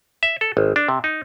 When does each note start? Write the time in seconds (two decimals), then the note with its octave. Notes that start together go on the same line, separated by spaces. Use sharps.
0.23 E5
0.41 A4
0.57 G#1
0.76 D4
0.88 C3
1.04 D#4